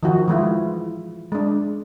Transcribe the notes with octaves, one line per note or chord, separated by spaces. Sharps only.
D#3 F3 F#4
E3 G#3 E4 F4
G#3 D4